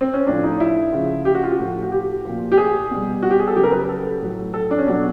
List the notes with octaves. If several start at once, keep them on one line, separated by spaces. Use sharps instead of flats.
C4
C#4
A2 F3 D4
D#4
E4
C#3 F3
G4
F#4
F4
F#4
A2 F3
F#4
G4
A#2 F3
G4
G#4
B2 G3
F#4
G4
G#4
A4
C#3 F#3 G4
A#4
B4
A4
A2 F#3
A4
D4
C#4
B2 F#3 D4